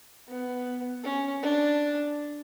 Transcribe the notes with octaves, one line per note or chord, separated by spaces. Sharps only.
B3
C#4
D4